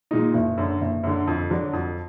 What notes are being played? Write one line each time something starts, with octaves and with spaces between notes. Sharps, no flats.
A#2 G#3 D#4
F#1
F#2 D3
F#1
F#2 D3
F2
D3 F#3 D4
F2